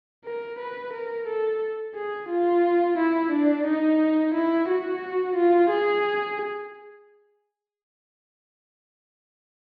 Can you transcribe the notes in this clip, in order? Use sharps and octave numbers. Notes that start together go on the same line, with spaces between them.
A#4
B4
A#4
A4
G#4
F4
E4
D4
D#4
E4
F#4
F4
G#4